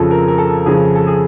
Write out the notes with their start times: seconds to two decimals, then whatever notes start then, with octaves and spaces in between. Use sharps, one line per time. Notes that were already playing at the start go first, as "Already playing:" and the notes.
Already playing: F2 C#3 F3 A4
0.11 A#4
0.28 A#4
0.38 A4
0.66 F2 C#3 F3 G#4
0.96 A4
1.07 G#4